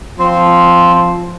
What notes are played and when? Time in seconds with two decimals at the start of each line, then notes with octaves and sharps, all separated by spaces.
0.19 F3 C4